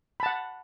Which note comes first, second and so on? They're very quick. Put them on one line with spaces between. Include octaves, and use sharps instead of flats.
B5 A5 F#5